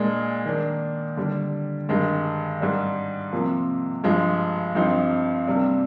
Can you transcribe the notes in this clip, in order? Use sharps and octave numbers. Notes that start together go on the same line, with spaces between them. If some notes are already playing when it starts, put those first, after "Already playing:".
Already playing: A#2 G#3 D4
D#3 A#3 D4
D3 G3 D4
G2 D#3 G#3
G#2 G3 D4
C3 F3 A#3
G2 F3 G#3
G2 F3 C4 D#4
C3 G3 A#3 D4